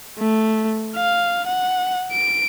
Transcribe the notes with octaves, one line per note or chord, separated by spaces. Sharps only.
A3
F5
F#5
D7